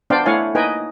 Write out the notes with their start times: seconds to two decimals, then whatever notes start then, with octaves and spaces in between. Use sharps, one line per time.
0.10 B3 D4 C5 D5 F5 G5
0.26 A3 E4 C#5 F5 F#5 G#5
0.55 A#3 D#4 B4 D#5 G5 G#5